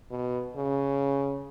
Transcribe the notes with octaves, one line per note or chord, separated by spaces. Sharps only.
B2
C#3